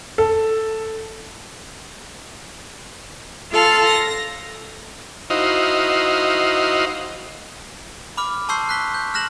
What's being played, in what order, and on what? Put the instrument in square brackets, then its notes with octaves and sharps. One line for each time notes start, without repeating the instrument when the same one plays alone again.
[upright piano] A4
[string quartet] F4 A4 F5 A5
A#6
[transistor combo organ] D#4 E4 F#4 C5 D#5 F5
[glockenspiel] B5 D6 F6
A5 C6 C#6 E6 G6 C7
F#6 B6 G7
G6
F6 F#6 A#6 E7 F#7